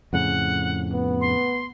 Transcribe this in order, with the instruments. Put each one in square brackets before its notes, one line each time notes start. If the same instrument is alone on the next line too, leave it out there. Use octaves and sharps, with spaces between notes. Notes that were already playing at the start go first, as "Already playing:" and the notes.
[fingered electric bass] F2 A2 C#3 [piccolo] F#5
[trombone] B3
[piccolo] C6